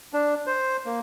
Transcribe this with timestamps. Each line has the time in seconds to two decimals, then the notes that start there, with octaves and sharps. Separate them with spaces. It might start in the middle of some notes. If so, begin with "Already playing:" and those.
0.13 D4
0.47 C5
0.86 A#3